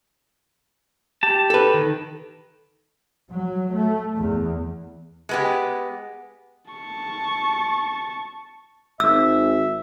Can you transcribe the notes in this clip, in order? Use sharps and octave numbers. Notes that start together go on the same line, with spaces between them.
G4 A5
A4 B4
D#3
F#3
A3
E2
G#3 B3 G4
A5 C#6
G#1 E5 E6